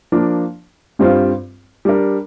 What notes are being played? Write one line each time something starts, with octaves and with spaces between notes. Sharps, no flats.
F3 A#3 D4
G2 G3 C4 F4 C5
G3 D4 A#4